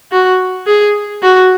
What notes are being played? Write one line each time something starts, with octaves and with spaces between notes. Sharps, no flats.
F#4
G#4
F#4